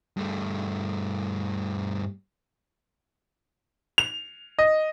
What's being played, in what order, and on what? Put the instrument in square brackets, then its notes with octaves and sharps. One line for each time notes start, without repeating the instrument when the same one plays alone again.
[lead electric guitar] G2 A3
[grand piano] F7
D#5